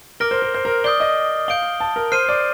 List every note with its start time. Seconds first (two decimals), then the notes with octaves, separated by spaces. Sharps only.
0.20 A#4 D6 F6 A#6 D7 G7
0.31 C5
0.42 A#4
0.54 C5
0.65 A#4
0.84 D5 D#6 G6 C7 G7
1.00 D#5
1.48 F5 G6 D7 G7
1.80 A5
1.96 A#4
2.12 C5 F6 C7 D#7
2.29 D5